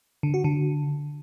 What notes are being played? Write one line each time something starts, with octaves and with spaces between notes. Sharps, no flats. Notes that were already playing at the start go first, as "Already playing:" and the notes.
D3
F#4
D3